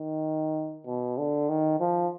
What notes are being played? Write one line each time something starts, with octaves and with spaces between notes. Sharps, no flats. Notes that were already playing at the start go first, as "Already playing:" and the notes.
Already playing: D#3
B2
D3
D#3
F3